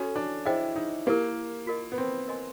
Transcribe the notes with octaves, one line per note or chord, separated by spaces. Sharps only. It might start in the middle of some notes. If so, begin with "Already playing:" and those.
Already playing: C#4 F#4 A4 C#5
D4
E4 G#4 C5 D#5 G5
D#4
A#3 E4 G4 A#4
F4 A#4 D#5
B3
C4
A#4 D#5 G#5 C6